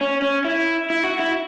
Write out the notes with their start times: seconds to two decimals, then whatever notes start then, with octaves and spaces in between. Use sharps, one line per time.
0.01 C#4
0.22 C#4
0.45 E4
0.90 E4
1.04 F#4
1.19 E4